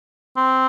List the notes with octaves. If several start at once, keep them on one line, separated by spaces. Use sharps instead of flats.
C4